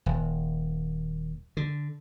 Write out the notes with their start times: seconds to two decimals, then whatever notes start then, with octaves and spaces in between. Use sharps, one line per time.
0.06 D#1
1.57 D3